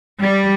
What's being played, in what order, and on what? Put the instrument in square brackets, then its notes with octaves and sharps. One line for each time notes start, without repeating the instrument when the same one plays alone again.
[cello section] G3